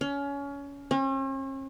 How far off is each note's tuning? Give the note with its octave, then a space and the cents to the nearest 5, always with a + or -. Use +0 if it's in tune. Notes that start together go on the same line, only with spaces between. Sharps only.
C#4 +25
C#4 -45